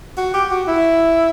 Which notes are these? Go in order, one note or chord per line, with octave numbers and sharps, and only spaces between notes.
F#4
G4
F#4
E4